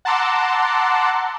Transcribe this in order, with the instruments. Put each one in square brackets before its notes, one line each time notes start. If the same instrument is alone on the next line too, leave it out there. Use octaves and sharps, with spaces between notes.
[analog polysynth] F#5 A5 A#5 C6 D6 E6